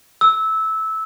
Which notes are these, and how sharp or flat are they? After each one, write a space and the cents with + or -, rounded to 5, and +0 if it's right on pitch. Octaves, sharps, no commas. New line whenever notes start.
E6 -15